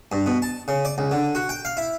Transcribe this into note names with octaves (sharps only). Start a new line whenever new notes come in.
G2
B2
A5
C#3
D5
C#2
D3
F#4
G5
F5
E4